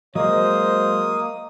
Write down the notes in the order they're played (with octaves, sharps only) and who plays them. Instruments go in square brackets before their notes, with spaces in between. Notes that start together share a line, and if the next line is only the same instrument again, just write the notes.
[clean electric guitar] F#3 G#3 [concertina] A#3 D#6 [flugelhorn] C5 [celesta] D#5